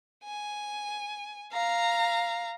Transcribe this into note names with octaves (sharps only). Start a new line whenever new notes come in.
G#5
F5 A#5